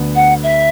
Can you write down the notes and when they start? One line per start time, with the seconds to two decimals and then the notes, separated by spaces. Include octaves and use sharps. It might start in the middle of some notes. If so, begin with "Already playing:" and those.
Already playing: D2 D3 B3
0.15 F#5
0.43 E5